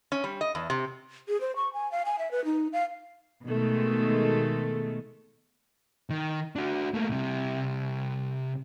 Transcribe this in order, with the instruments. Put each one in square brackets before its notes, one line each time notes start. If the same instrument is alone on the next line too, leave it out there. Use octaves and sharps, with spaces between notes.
[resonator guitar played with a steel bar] C#4
G3
D#5
E2
C3
[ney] G#4
C5
C#6
G#5
F5
G#5
E5
B4
D#4
F5
[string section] B2 D#3 G#3 A3
[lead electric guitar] D#3
D4 F#4
A3 A#3
C2 C3